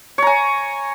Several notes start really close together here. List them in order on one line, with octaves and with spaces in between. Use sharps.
C#5 A#5 G#5